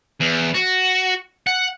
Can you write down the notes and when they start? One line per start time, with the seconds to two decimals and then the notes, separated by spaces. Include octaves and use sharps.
0.20 E2
0.54 F#4
1.47 F#5